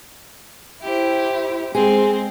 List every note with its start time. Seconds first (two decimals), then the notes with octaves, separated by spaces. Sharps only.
0.82 E4 G4 C5
1.75 G#3 C4 G#4 C5